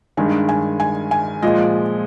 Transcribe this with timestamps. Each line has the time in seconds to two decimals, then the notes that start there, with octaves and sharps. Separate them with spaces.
0.17 G2 D#3 G#3 G#5
0.49 G#5
0.80 G#5
1.11 G#5
1.42 A#2 F3 G#3 D#5